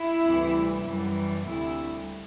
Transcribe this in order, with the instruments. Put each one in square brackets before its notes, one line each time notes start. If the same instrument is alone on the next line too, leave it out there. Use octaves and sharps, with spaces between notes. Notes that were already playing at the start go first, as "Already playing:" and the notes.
Already playing: [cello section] E4
D2 C3 E3 G3
F#2 E3 G3
D2 C3 G3 E4